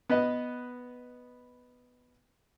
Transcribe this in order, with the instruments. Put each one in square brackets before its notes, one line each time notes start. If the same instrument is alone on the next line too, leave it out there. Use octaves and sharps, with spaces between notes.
[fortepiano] B3 B4 D#5